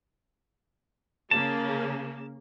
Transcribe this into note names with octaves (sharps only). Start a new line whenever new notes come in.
C#3 A#3 A5